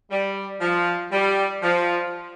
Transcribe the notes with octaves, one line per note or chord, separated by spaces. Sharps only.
G3
F3
G3
F3